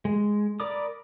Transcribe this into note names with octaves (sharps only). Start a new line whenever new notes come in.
G#3
A#4 D5 B5 D6 D#6